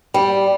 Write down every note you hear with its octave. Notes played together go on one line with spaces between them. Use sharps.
G3